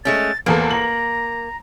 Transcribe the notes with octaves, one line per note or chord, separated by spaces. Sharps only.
G#3 A3 C#4 A6
A1 E2 A#3 G#4 A4
A#5 F#7